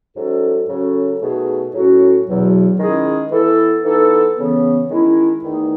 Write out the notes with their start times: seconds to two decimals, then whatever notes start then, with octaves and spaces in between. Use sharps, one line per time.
0.16 G#2 F#3 C#4 F#4 A4
0.68 C#3 F#3 C#4 F#4 A4
1.20 B2 A3 D#4 G#4
1.73 A2 F#3 C#4 F#4 A4
2.26 E2 B2 F#3
2.79 D#3 G#3 C#4 E4 G#4
3.32 E3 B3 E4 A4
3.84 E3 B3 D#4 A4
4.36 C#3 E3 B3
4.89 D#3 G#3 C#4 E4
5.43 E2 D#3 A3 D#4 G#4